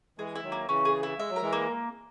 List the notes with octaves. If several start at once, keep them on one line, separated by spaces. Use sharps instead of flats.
E3 G#3 G#4
E4
D#3 F#3
A#3
C#3 E3 C#4
G#4
E4
G#3 E5
F#3
A#4
E3 G#3
A#3